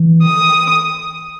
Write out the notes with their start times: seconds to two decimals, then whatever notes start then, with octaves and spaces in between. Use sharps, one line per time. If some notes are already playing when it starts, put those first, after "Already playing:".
Already playing: E3
0.23 D#6